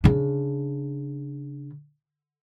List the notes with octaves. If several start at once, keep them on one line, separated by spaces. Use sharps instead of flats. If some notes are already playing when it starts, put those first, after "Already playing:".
C#3 D4